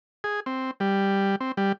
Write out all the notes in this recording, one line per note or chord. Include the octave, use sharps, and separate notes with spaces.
G#4
C4
G3
C4
G3